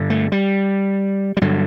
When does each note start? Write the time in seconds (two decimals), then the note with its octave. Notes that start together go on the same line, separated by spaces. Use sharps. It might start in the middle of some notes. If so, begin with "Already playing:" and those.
Already playing: G2 D3
0.10 A3
0.32 G3
1.37 G3
1.41 G2 D3 F#3